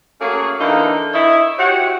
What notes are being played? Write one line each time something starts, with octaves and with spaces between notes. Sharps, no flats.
A3 A#3 C#4 F#4 G#4
D3 E3 A#3 D#4
E4 C#5 D#5 E5
F#4 G4 C#5 F#5